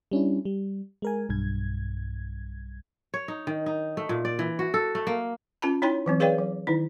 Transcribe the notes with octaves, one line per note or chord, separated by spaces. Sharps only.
G3 C#4 D4 E4
G3
G#3 A#4 G#5
B1 G2 G#6
C#5
D#4
D#3
D#4
A3
A#2
D5
E3
F#4
A4
A3
A#3
C#4 F4 A5 B5
D#4 E4 C#5 G5 B5 C6
E3 F#3 C4
G#4 B4 C#5 D5 F5 G5
F#3
D#3 D#4 E4